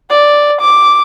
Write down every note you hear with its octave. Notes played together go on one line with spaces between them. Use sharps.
D5
D6